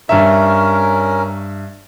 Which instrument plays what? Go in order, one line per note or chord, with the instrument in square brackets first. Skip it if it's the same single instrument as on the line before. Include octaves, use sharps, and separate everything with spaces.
[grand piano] G2 E5 [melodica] C#4 A#4